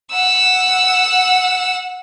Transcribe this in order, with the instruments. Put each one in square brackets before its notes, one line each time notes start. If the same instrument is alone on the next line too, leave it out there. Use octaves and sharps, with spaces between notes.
[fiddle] F#5 E6